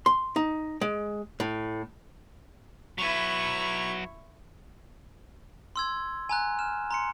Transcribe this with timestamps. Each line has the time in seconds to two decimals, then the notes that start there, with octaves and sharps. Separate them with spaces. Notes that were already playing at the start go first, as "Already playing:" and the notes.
0.06 C6
0.36 D#4
0.81 G#3
1.40 A2
2.98 F#3 E4 B4 C#6
5.76 C6 E6 G#6
6.29 G#5 A#5 F#6
6.59 F6 E7
6.91 A#5 C6 C#7